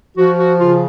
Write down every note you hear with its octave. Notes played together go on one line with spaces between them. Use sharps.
F3 F#4
F#4
C#3 F4